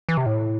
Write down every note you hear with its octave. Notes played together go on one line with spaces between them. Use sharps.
E3
C3
A2